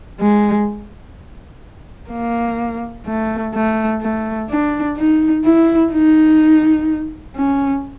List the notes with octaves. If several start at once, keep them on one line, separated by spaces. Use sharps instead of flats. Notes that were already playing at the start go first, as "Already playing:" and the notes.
G#3
A#3
A3
A3
A3
D4
D#4
E4
D#4
C#4